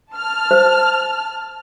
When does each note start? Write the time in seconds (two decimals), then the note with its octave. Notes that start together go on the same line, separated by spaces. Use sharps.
0.15 A5 F6
0.51 C5